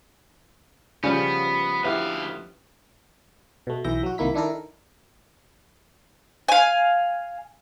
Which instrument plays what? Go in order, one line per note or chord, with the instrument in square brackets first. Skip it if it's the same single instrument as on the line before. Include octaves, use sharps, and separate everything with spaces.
[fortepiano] C#3 [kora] F3 G3 C#4 [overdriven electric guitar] B3
[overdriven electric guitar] D2 F5 [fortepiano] B3 E4 G4
[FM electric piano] B2 A3
B1 E3 E5 G6 A#6
F#3 F#4
C2 D#3 A#3 E4 B6
D#3 D4 E4 A4 A#4
[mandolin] F5 G#5